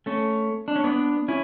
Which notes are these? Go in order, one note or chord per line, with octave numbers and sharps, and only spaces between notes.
A3 C#4
D4
C#4
B3 D4
C#4 E4